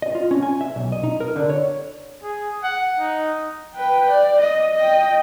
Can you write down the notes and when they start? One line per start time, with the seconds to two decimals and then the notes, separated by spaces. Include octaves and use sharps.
0.02 D#5
0.15 F4
0.31 C#4
0.43 G#5
0.61 E5
0.76 B1
0.92 D#5
1.04 D#4
1.20 A#4
1.36 D3
1.50 C#5
2.23 G#4
2.63 F#5
3.00 D#4
3.75 B4 G5
4.09 D5
4.41 D#5
4.75 D#5 G5